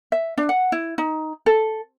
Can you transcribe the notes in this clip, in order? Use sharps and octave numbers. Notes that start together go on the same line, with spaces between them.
E5
D4
F#5
E4
D#4
A4